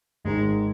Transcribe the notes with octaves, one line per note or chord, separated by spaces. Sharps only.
G#1 G#2 D#3 G#3